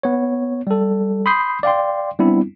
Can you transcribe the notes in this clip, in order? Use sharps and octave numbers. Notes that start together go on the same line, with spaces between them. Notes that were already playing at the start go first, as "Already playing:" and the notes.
B3 C#5
G3 A4
B5 C6 D#6 G6 C7
D5 F5 G5 C6
G3 B3 C4 D4 E4